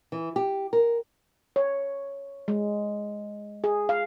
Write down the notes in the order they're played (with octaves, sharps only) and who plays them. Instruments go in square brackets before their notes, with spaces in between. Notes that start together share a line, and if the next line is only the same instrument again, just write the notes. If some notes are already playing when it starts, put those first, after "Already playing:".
[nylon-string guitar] E3
G4
A#4
[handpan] C#5
G#3
G#4
F5